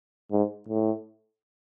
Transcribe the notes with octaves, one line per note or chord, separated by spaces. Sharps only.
G#2
A2